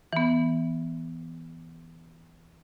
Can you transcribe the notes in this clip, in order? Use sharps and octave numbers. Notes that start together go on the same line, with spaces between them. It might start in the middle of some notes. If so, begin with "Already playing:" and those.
E3 B3